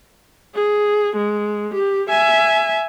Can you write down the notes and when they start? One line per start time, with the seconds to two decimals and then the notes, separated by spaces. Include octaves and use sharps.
0.55 G#4
1.16 G#3
1.74 G4
2.09 E5 G#5